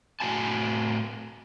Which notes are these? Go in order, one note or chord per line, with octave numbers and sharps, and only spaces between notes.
A2 F#4 G#5 A5